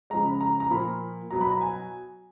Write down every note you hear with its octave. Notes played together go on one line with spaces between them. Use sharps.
C#3 F3 G#3 A#5
B5
A#5
A#5
A#2 F3 A#3 B5
B2 F#3 B3 A#5
B5
A#5
G#5